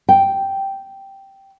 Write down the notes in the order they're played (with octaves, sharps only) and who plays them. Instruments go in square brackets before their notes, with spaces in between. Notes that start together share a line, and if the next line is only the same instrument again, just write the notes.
[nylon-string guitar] G5